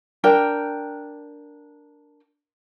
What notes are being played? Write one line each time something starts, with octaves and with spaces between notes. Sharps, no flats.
D4 A#4 G5